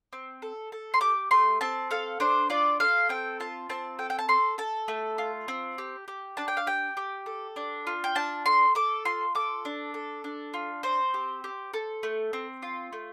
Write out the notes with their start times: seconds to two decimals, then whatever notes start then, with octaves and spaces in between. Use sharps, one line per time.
0.13 C4
0.42 A4
0.72 A4
0.94 C6
1.01 G4 D6
1.31 A3 C6
1.61 C4 A5
1.91 A4 F5
2.20 D4 C5
2.50 F4 D5
2.80 A4 F5
3.09 C4 G5
3.40 F4 A5
3.69 C4 A5
3.99 A4 G5
4.10 G5
4.19 A5
4.28 A4 C6
4.58 A4 A5
4.88 A3
5.18 F4
5.48 C4
5.78 G4
6.08 G4
6.37 D4 A5
6.48 G5
6.57 F5
6.67 G4 G5
6.97 G4
7.26 A4
7.56 D4
7.87 F4
8.04 G5
8.15 D4 A5
8.46 A4 C6
8.75 A4 D6
9.05 F4 C6
9.35 A4 D6
9.65 D4
9.94 A4
10.24 D4
10.54 F4
10.83 C4 C5
11.14 G4
11.44 G4
11.73 A4
12.03 A3
12.33 C4
12.62 F4
12.93 A3